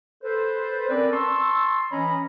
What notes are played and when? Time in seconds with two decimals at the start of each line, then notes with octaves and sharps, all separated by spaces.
0.23 A4 B4 C5
0.89 C4 C#4 A#4 B4 D5
1.12 A5 C6 C#6 E6
1.92 E3 C#4 C#5 D#5 A#5 B5